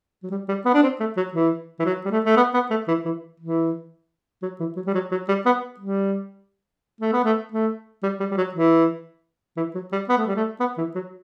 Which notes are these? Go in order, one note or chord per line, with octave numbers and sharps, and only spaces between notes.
F#3
G3
G3
B3
D4
C4
A3
F#3
E3
E3
F#3
G3
A3
A3
B3
B3
A3
E3
E3
E3
F#3
E3
F#3
G3
F#3
F#3
G3
B3
G3
A3
B3
A3
A3
G3
G3
G3
F#3
E3
E3
F#3
G3
B3
A3
G3
A3
B3
E3
F#3